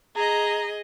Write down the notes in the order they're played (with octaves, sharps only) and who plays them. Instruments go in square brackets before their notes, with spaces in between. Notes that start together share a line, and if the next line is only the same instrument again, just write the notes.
[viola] G#4 D#5 [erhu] A#5